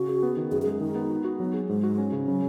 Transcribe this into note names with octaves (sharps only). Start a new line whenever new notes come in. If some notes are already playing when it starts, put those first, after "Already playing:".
Already playing: C#3 F#4
G#4
B3
D#3
F#2 G#4
G#4
G#3
D#3 D#4
B3
F#4
F#4
F#3 B3
G#4
G#2 G#3
F#4
C#4
C#3
C#3 F#3